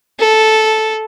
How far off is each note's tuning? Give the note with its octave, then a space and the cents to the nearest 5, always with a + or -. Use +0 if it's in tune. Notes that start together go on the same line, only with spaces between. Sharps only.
A4 -10